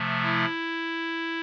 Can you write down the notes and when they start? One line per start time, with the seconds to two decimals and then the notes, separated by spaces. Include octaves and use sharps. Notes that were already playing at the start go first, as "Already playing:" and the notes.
Already playing: C3 F3 A3
0.23 E4